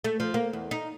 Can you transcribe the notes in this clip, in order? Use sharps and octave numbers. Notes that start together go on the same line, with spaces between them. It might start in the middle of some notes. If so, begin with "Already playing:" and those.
A3
F3
A#3
E2
D#4